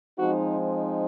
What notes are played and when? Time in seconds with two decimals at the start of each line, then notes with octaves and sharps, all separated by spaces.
0.17 F3 G#3 C4 D#4 F#4
0.63 D#4